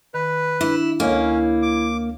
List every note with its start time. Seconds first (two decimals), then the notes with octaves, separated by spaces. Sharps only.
0.14 D#3 B4
0.61 D4 E4
1.00 D2 A#3 C#4 E4 C#5 D#5
1.62 D6